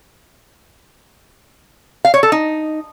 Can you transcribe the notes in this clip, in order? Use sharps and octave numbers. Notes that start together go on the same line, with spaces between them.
F5
C#5
A4
D#4